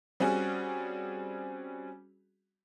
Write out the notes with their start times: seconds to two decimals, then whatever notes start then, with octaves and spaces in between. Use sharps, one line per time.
0.20 G3 C4 C#4 F#4 G#4